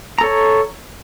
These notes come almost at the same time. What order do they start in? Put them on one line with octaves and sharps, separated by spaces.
A#5 A4 C#5